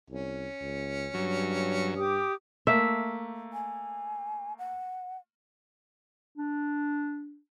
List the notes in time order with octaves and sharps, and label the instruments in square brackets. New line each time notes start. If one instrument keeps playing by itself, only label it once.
[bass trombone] C2 [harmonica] C#4
[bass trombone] C#2
[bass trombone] G2 [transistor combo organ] F#3
[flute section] G4 D6 D#6
[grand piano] A3 A#3 [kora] E5
[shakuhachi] G#5
F#5
[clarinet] D4